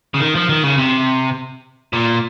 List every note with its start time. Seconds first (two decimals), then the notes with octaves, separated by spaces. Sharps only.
0.14 C#3
0.20 D#3
0.35 F3
0.49 D#3
0.63 C#3
0.78 C3
1.93 A#2